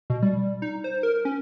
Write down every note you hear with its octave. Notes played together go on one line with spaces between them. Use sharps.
B2
G3
D#4
C5
A#4
C#4